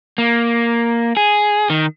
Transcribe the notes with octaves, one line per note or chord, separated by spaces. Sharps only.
A#3
G#4
D#3